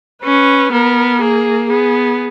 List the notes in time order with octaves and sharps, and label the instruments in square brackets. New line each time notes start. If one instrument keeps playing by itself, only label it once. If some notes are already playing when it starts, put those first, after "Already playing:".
[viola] C#4 [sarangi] B4
[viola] B3 [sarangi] A#4
[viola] A#3 [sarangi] G#4
[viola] B3 [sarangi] G#4